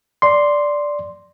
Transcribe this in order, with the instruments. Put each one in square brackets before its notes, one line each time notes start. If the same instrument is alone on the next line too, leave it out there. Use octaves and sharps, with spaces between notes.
[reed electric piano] D5 C6